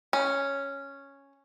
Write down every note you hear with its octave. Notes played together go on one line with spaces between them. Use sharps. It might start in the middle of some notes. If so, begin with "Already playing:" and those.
C#4